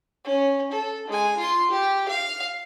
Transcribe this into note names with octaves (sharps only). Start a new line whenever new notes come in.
C#4
A4
G#3 G#5
F4 C6
G4
F5